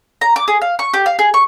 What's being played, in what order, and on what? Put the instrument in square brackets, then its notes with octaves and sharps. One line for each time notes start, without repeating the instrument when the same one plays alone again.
[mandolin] A#5
D6
G#4
F5
C#6
G4
F5
G#4
C#6